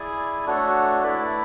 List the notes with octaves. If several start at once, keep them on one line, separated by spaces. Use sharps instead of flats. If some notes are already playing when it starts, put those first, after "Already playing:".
Already playing: E4 G#4 D5 G#5
A3 D4 F#4 A4 C#5
A3 E4 B4 D5